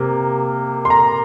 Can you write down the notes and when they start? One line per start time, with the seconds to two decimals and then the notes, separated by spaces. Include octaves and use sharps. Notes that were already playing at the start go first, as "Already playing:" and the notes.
Already playing: C3 A#3
0.85 C6
0.90 A#5